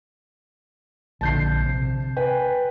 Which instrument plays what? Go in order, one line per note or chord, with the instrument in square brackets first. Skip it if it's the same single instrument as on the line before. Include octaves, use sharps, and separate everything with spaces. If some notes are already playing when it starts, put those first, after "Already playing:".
[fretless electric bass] A#1 D3 [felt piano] A5 G6 C7
[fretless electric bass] C3
[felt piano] B4 G5 G#5